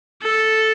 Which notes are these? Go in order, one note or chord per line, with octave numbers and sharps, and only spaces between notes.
A4